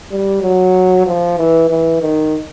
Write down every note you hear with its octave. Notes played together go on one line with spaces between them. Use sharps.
G3
F#3
F3
E3
E3
D#3